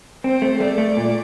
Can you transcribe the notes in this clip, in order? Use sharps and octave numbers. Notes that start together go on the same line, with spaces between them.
C4 C5
A3
A3 D5
A3
A#2